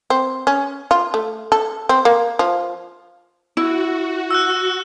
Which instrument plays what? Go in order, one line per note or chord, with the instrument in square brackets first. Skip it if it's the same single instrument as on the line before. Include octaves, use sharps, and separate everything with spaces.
[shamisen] C4
C#4
F4
A3
A4
C4
A#3
F3
[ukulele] E4 [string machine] F#4
[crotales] E6 F#6